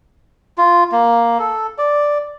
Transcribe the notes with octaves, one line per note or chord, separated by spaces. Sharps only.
F4
A#3
A4
D5